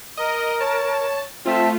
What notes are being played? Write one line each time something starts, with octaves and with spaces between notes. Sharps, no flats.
A#4 D#5
C#5 A5
A3 C4 F4 E5 A5